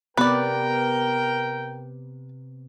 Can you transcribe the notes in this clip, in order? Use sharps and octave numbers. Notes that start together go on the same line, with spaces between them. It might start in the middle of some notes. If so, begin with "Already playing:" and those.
C3 B3 A#4 B4 D5 G5